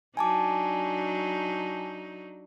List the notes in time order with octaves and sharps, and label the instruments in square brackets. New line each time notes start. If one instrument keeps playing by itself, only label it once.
[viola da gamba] F#3 D4 D#4 [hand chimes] G#5 A5 D6